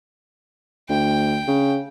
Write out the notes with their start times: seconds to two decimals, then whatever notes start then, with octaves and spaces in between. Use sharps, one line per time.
0.89 D2 G5
1.48 C#3